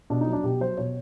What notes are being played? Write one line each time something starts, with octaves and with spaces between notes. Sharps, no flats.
B2 D4
D#4
F#3
D4
B2 G4
F#3 C5
B2 C#5